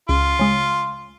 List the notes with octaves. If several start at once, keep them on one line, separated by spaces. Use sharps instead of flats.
C#2 F4
C#3 G#3